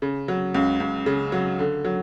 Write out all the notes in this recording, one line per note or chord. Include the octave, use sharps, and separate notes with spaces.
C#3
F#3
C#2
C#2
C#3
F#3
D3
F#3